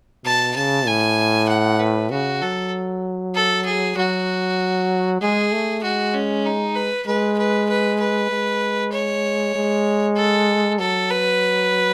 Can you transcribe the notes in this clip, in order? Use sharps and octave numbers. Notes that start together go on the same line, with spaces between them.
B2 A5
C#3 A5
A2 G#5
F#5
B4
C#3 F#4
F#3 A4
A4
G#4
F#3 F#4
G#3 G#4
A3
G#3 F#4
C#4
D#4
B4
G#3 B4
B4
B4
B4
G#3
C#5
G#3
A4
F#3 A4
B4